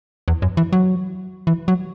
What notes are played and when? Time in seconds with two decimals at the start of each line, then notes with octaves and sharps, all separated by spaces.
0.28 E2
0.42 F#2
0.57 E3
0.73 F#3
1.47 E3
1.68 F#3